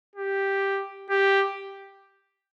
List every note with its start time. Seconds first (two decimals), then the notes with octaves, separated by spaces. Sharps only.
0.16 G4
1.10 G4